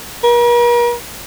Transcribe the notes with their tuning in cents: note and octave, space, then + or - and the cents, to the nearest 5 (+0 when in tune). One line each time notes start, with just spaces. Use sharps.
A#4 +45